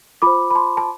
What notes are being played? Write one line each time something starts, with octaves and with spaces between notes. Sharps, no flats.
F4 C5 B5 D6
B5
A5 C6
A5